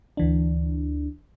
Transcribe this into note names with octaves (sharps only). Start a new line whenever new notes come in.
D2 E3 D4